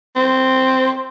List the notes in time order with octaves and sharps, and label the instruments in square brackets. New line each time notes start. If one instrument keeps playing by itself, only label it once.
[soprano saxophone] C4